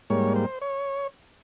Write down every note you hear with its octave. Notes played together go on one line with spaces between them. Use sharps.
G#2 G3 A#3 C#5
C5
C#5